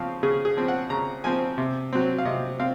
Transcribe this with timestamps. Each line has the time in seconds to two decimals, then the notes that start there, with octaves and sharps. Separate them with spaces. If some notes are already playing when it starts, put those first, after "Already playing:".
Already playing: C#3 F3 C4 F5
0.23 C#3 G#4
0.45 G#4
0.57 F3 C4
0.68 F#5
0.90 C#3 A#5
1.24 F3 C4 G#5
1.58 C3
1.93 F#3 C4
2.18 F5
2.25 C3 D#5
2.60 C4 F5